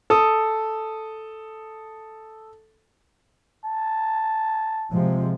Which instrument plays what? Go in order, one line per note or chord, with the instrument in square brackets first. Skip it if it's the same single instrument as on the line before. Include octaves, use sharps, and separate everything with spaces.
[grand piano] A4 D#6
[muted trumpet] A5
[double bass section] C3 F3 G#3